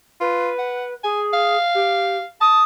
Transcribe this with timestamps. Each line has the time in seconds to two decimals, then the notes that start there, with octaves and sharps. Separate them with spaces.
0.21 F4 B4
0.58 F#5
1.03 G#4 G#5
1.33 F5
1.74 G4
2.41 A5 D#6